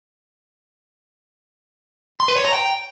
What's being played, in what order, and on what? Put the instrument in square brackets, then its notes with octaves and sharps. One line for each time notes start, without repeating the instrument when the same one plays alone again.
[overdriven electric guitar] C6
B4
C#5
A#5
G5